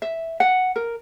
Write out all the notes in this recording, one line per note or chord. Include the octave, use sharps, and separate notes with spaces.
E5
F#5
A#4